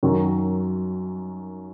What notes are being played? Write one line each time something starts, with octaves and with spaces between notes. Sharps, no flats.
F#2 D#3 F#3